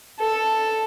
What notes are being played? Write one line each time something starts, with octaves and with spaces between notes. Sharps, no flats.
A4